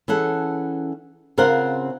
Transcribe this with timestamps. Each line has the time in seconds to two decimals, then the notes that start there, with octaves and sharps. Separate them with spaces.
0.08 E3 C#4 G#4 A4 F#5
1.38 C#3 C4 F4 A#4 C5 F#5